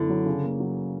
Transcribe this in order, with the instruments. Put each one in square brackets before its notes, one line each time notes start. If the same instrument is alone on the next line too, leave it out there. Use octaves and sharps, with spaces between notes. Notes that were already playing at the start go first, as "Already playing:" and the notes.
Already playing: [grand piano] F#2 B3 E4 A4 [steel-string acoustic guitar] D3
[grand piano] F#3
C#3
A#3
F#3